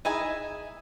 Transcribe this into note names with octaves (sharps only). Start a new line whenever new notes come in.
D#4 E4 G#4 G#5